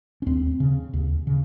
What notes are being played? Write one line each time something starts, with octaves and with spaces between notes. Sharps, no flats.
C#4
D#2 C4
C#3
D#2
C#3